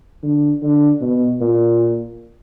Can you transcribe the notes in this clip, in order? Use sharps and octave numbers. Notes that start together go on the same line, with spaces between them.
D3
D3
B2
A#2